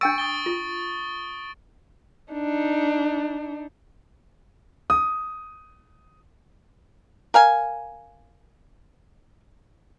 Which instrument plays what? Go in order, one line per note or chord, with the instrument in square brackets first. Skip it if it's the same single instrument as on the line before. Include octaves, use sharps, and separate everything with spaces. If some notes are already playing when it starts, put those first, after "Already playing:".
[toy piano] D4 G5 E6 [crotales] C#6 A6 D7
[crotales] D#6 A6 G7
[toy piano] F4
[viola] D4 D#4
[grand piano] D#6
[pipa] A#4 F5 G#5